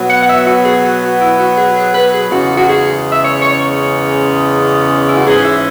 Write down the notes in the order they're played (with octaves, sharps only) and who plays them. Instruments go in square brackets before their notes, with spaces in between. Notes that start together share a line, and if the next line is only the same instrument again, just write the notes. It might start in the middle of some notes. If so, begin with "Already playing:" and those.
Already playing: [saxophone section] B2 F#3 B3
F#5
F#5
E5
F#4
G#4
F#4
F#4
E4
F#4
G#4
G#4
B4
G#4
E2 C#3 G#3 C#4 F#4
F#4
G#4
E5
C#5
C#5
C#5
E4
F#4
G#2 E3 C#4 G#4
E5